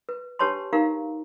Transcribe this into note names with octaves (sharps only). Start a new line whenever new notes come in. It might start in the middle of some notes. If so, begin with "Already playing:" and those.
B4
D4 G4 B4 C#5 A5 C6
D#4 G4 A#4 F5 A#5